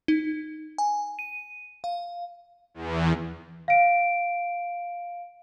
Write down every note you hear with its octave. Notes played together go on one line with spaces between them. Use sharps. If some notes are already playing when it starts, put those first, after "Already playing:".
D#4
G#5
D#7
F5
E2
F5 D7